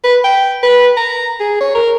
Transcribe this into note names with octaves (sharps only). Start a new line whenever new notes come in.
B4
G5
B4
A#5
G#4
C#5
A#4